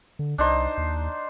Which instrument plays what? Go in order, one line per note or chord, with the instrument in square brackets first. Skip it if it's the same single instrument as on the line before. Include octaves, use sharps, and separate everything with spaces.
[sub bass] D3
[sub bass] C2 [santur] D4 D#4 C5
[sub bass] D#2